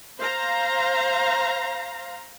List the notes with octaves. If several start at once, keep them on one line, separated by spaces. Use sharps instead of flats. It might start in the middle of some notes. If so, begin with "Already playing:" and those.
C5 F5 A#5